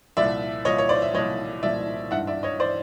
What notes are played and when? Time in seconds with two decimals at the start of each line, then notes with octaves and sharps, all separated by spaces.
0.17 C2 A#2 F3 D5 E5
0.65 C2 A#2 F3 C#5 D#5
0.78 C#5
0.89 C5 D5
1.02 E5
1.14 C2 A#2 F3 C#5 D#5
1.63 C2 A#2 F3 D5 E5
2.11 G#1 G2 E3 E5 F#5
2.27 D5 E5
2.43 C#5 D#5
2.60 E3 C5 D5